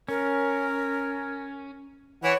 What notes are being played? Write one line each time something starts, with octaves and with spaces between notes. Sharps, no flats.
C#4 A#4
E3 E4 C#5 F#5